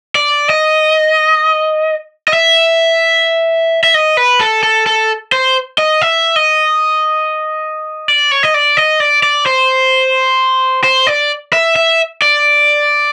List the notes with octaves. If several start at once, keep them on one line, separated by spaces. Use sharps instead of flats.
D5
D#5
D#5
E5
E5
D#5
B4
A4
A4
A4
C5
D#5
E5
D#5
D5
C#5
D#5
D5
D#5
D5
D5
C5
C5
D5
E5
E5
D5